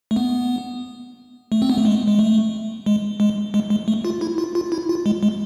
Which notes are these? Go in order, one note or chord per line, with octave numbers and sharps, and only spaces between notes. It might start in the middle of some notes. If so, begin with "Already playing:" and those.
A3
B3
A3
C4
B3
A3
G#3
G#3
A3
G#3
G#3
G#3
G#3
A3
F4
E4
F4
F4
E4
F4
G#3
G#3